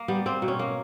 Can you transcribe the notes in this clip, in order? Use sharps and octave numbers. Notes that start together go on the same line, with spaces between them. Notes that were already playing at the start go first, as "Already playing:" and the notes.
Already playing: A#3
G3 B3
A#3 C4
B2
C#4
A#3